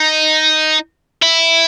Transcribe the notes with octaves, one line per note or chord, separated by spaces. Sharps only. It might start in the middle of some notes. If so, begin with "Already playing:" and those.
Already playing: D#4
E4